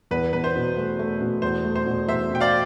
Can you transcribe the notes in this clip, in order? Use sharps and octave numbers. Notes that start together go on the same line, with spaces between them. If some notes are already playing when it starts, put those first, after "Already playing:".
E2 B4
E2 B4
C5
B2
A3
A3
B2
E2 C5
A3
C5
B2
E2 C5 E5
B2 G5
D5 F5